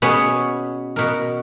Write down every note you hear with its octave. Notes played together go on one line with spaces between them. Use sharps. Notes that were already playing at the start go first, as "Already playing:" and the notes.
B2 B3 C#4 G#4
B2 A#4